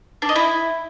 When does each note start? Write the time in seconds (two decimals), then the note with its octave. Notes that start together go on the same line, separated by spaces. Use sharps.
0.22 D4
0.29 D#5
0.36 E4